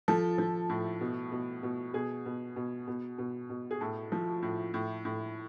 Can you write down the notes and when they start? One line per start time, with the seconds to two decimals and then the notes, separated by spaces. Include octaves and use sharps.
0.08 F3 A4
0.38 F3
0.70 A2
1.01 B2
1.32 B2
1.63 B2
1.94 B2 G#4
2.26 B2
2.56 B2
2.87 B2
3.18 B2
3.49 B2
3.71 G#4
3.81 A2 A4
4.12 F3
4.43 A2
4.74 A2
5.05 A2